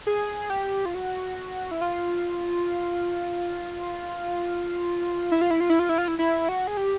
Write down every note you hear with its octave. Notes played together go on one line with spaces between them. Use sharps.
G#4
G4
F4
F#4
E4
F4
E4
F4
E4
F4
E4
F4
E4
F4
E4
E4
F#4
G#4
G4